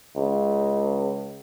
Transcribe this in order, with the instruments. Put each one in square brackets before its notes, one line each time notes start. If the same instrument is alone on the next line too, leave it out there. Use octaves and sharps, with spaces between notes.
[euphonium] C#2